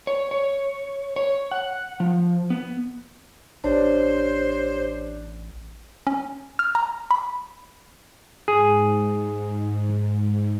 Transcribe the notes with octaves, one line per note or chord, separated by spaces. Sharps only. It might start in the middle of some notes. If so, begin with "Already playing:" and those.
C#5
C#5
C#5
F#5
F3
B3
A1 D4 G4 C5 C#5
C#4
F6
A#5
B5
G#2 G#4